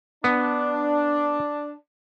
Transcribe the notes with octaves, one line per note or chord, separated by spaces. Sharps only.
B3 D4